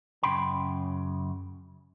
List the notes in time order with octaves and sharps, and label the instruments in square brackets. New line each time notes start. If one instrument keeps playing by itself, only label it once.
[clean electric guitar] F#2 C#3 G5 B5 C6